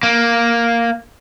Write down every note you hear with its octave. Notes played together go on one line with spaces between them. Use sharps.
A#3